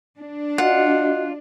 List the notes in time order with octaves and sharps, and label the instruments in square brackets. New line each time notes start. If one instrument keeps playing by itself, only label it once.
[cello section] D4
[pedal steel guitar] F4 [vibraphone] F#4 D#5 [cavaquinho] F#5